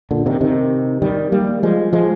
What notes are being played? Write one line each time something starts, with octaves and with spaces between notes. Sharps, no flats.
A#2 D3
C3 D#3
C3 D#3
D#3 G3
G3 A#3
F3 G#3
F3 G#3